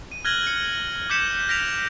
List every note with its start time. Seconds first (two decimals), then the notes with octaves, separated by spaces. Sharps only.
0.12 D#7
0.25 F6 F#6 G#6 A#6 F#7 G7
0.47 C#7
1.10 D6 F6 G6 B6 C#7 E7
1.49 F6 A#6 B6 D7 F7